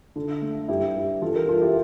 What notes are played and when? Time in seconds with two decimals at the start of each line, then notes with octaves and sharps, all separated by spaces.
0.16 D3
0.42 A3
0.68 G2 E4 G4
0.96 G2
1.22 E3 F4 A4
1.35 G4 A#4
1.48 G3 F4 A4
1.61 E4 G4